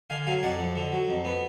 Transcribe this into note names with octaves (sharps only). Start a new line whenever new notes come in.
D3 F5 G#5
F#3 F5 G#5
F2 D5 F#5
F2
D3
F#3
F2
B3